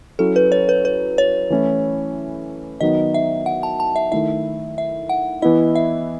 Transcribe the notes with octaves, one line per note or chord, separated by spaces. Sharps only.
F#3 C#4 E4 A4
B4
C#5
B4
B4
C#5
E3 A3 C#4 E4
D#3 F#3 B3 D#4 D#5
E5
F#5
A5
A5
E5
D#3 A3 E4 E5
E5
F#5
E3 B3 E4 D#5
E5